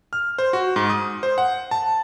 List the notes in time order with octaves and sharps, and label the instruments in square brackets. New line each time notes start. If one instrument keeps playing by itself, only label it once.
[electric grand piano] F6
C5
F#4
G#2
D#6
C5
F#5
A5